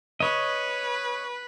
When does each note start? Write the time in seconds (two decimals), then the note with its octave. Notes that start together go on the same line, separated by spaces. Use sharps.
0.20 B4 C#5 D#5